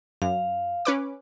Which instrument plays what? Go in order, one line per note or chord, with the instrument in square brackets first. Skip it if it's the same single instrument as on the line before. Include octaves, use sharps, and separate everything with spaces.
[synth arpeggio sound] F#2 [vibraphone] F5
[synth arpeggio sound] C#4 B4 D6